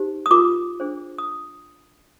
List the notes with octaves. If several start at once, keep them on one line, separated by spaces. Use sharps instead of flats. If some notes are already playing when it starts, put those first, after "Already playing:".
Already playing: D#4 G4 C5
D#6
F4 A#4 D6
D4 G#4 C5
D#6